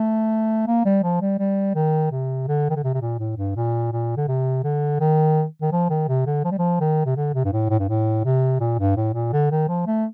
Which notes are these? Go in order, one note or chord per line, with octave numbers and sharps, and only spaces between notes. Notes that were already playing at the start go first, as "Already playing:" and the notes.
Already playing: A3
A#3
G3
F3
G3
G3
D#3
C3
D3
D#3
D3
C3
C3
A#2
A2
G2
A#2
A#2
D3
C3
D3
D#3
D#3
F3
D#3
C3
D3
F3
G3
F3
D#3
C3
D3
C3
G2
A2
A2
G2
A2
C3
A#2
G2
A2
A#2
D3
D#3
F3
A3